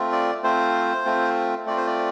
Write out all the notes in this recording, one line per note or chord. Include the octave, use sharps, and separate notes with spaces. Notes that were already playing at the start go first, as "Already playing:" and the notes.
Already playing: A3 C4 F4
D5
A3 C4 F4 C5
A3 C4 F4
A3 C4 F4 D5
C5
D5